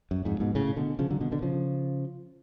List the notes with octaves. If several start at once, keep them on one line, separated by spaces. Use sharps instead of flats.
F#2
F2 G#2
G#2 B2
A2 C#3
B2 D3
C#3 F3
D3 F#3
B2 D3
B2 D3
C#3 F3